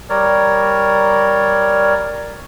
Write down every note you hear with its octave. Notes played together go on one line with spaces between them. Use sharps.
G3 A#4 C#5 D5